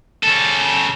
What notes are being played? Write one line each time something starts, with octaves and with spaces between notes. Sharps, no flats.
C#3 A4